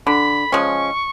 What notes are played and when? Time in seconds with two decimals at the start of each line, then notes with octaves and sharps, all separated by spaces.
0.06 D3 B5
0.52 F3 G#3 C#4 C#6